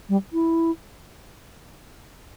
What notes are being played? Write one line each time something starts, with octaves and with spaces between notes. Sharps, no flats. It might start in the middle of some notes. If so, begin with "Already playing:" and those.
G3
E4